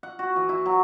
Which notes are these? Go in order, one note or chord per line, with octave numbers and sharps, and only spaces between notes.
F#5
F#4
E3
E4
F#3